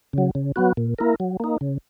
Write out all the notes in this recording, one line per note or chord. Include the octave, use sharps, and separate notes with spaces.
C#3 F#3
C#3
F#3 B3 F#4
A#2
A#3 E4 A#4
F#3
A#3 D#4
C#3